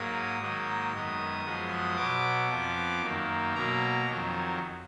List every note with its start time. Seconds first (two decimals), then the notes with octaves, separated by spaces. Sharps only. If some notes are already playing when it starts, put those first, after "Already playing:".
Already playing: G#2 F#3 A#3 D#6
0.41 G#2 D#3 F#3 A#3
0.92 F#2 D#3 G#3 B3
1.45 F#2 F3 G#3 B3
1.97 B2 F#3 B3 D6
2.49 F2 F3 B3
3.02 F#2 D#3 A#3
3.54 B2 F#3 A#3 A#5
4.07 F2 D#3 F#3